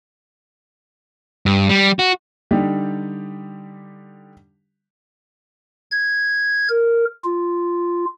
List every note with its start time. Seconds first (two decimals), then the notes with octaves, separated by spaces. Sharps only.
1.46 G2
1.69 G3
1.99 F#4
2.51 D3 G3 D#4 G4
5.91 G#6
6.69 A#4
7.24 F4